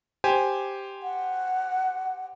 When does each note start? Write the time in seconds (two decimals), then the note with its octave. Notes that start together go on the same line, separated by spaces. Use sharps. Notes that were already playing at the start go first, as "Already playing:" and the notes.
0.24 G4 C5 G#5
1.03 F#5